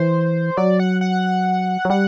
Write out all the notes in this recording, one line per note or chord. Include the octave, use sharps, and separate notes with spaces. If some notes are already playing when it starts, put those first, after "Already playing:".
Already playing: E3 C5
F#3 D5
F#5
F#5
F#3
G3 F#5